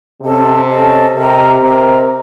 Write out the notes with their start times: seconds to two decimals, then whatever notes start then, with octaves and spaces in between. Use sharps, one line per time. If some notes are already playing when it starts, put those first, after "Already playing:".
0.22 C3 C#4 A4 D#5 A5
0.68 C#4 A4 D#5 A5
1.15 C3 A#4 D#5 A#5
1.61 C3 A#4 D#5 A#5